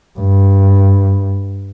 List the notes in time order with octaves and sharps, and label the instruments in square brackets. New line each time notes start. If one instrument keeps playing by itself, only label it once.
[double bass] G2